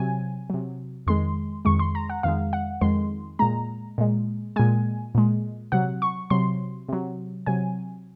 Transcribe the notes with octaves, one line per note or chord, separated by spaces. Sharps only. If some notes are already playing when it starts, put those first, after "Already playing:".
Already playing: C3 F#3 G#5
C3 F#3
F2 D#3 G#3 C6
F2 D#3 G#3 C#6
C6
A#5
F#5
F2 D#3 G#3 F5
F#5
F2 D#3 G#3 C6
A#2 G#3 A#5
A#2 G#3
A#2 G#3 G#5
A#2 G#3
C3 F#3 F#5
C#6
C3 F#3 C6
C3 F#3
C3 F#3 G#5